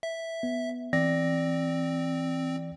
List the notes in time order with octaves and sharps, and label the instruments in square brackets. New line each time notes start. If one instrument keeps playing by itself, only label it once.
[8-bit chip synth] E5
[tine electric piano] B3
[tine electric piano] E3 D5 A#6 [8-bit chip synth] C4